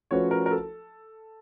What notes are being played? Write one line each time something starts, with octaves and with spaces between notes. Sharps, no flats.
F3 A3 C#4 F#4 B4 C#5
A#4
A#4
A4